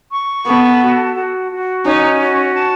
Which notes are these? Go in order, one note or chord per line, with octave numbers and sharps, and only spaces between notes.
C#6
B3 A4
F#4
F#4
F#4
C#4 D#4
F#4
A5